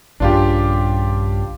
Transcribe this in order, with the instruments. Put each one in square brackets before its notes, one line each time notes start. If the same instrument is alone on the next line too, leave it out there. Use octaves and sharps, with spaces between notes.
[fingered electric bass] A#1 G2 C#3 [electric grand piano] D4 F4 G4